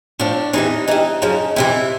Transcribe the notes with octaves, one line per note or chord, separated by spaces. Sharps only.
A2 F3 D4
E2 C3 E3 D#4
G2 E3 D#4
F#2 C#3 F3
F2 C3 E3 E4